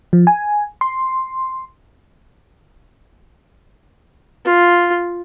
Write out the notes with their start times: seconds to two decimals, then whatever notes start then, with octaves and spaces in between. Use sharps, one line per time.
0.13 F3
0.27 G#5
0.81 C6
4.46 F4